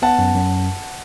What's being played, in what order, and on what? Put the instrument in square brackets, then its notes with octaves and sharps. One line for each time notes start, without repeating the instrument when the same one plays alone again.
[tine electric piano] B3 [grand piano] F#5 A5
[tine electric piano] F#2
F#2